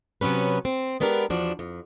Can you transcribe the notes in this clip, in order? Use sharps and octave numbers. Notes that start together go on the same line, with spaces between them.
C3 F#3 B3 C#4 B4
C4
G#3 B3 D4 G4 A#4 B4
E2 F3 D4 F#4
F2